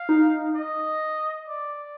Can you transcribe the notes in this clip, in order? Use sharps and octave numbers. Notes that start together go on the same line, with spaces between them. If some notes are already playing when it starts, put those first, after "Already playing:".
Already playing: F5
D#4
D#5
D5